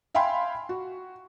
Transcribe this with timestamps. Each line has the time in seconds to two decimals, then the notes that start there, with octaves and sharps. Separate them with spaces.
0.14 E5 F5 G5 G#5 B5 C6
0.69 F#4